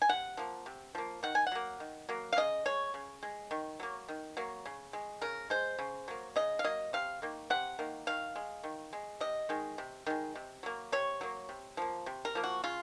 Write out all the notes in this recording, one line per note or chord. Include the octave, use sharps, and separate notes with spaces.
G#5
C3 F#5
F3 A#3
C3
F3 A#3
D#3 F#5
G#5
F#5
F#3 A#3
D#3
F#3 A#3
F5
C#3 D#5
G#3 C#5
C#3
G#3
D#3
F#3 A#3
D#3
F#3 A#3
C#3
G#3
C#3 A#4
G#3 C5
C#3
F#3 A#3
C#3 D#5
F5
F#3 A#3 D#5
C3 F5
D#3 A#3
C3 F#5
D#3 A#3
D#3 F5
G#3
D#3
G#3
C3 D#5
D#3 G#3
C3
D#3 G#3
C3
F#3 A#3
C3 C#5
F#3 A#3
C3
F3 A#3
C3
A#4
F3 A#3
F#4
C#3 F4